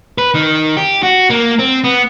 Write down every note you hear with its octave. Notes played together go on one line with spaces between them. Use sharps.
B4
D#3
G4
F#4
A#3
C4
B3